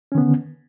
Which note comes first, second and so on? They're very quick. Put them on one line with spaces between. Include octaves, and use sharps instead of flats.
C#4 D#3 B3 D3